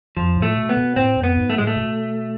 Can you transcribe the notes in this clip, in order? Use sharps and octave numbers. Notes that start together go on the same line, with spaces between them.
F2 F3
A2
A3
B2
B3
B2
A2 C4
F2
B3
G#2
A3
A2 G#3
A3
B2